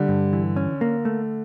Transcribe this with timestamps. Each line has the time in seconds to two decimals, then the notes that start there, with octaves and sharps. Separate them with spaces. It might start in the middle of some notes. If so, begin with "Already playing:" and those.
Already playing: D3 G3
0.08 G2
0.33 E3
0.56 C#4
0.81 A#3
1.05 A3